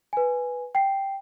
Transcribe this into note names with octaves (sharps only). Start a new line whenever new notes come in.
B4 G#5
G5 C7